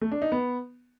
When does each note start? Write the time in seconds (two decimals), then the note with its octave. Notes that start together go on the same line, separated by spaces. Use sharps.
0.01 A3
0.12 D4
0.22 D#4
0.32 B3